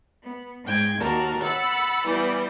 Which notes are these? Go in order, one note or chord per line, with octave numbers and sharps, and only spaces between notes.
B3
G#2 G5 G#6
D#2 F#4 A#4 A5
F#5 B5 E6 A6
E3 G3 B3